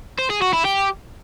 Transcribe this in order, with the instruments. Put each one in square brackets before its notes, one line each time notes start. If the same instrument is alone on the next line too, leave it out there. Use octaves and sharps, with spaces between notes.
[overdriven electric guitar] C5
G#4
F#4
E4
G4